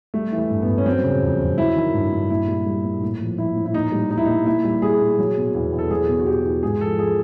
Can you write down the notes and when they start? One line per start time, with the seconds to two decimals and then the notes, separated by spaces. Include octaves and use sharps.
0.14 G3 A3
0.32 E3
0.38 A3
0.50 G2
0.62 B3
0.67 G2
0.78 C#4
0.86 F#3 C4
1.04 C#3
1.22 F2
1.40 F2
1.58 F#3 E4
1.76 D#3
1.94 G2
2.13 G2
2.30 A#2 E4
2.48 G3
2.66 G3
2.84 A#2
3.02 A2
3.20 F3
3.38 F3 E4
3.56 A2
3.66 E4
3.74 A#2 D#4
3.92 G3
4.10 G3 D#4
4.18 E4
4.25 A#2 D#4
4.46 A#2 E4
4.64 G3
4.82 G3 G#4
5.00 A#2
5.19 F#3
5.37 B2
5.54 E2
5.73 E2
5.79 A4
5.91 F#3 G#4
6.08 B2
6.19 F#4
6.27 E2 G4
6.45 E2
6.63 G#2 G#4
6.81 F3 A4
6.99 F3 G#4